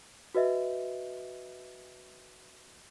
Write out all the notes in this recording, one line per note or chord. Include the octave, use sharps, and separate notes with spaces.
F#4 B4 D#5 E5